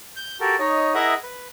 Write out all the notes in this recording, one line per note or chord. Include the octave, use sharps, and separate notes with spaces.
G6
F#4 G4 A4 A#4
D#4 C#5 D#5
E4 G#4 A#4 D#5 E5 F#5
B4